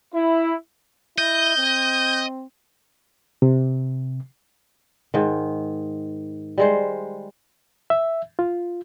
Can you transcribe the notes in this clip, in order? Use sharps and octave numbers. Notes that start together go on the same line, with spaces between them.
E4
E4 D#5 G6
C4
C3
G#2 D#3
G3 G#3 C5
E5
F4